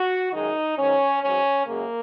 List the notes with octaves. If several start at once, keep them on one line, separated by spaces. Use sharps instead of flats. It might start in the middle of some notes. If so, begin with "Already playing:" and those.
Already playing: F#4
F#2 D#3 G#3 D#4
G#2 D#3 F#3 C#4
G#2 F#3 C#4
F#2 C#3 G#3 A#3